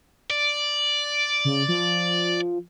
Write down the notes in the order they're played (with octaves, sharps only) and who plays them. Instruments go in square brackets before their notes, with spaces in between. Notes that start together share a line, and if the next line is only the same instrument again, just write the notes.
[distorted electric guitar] D5
[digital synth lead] C#3
F3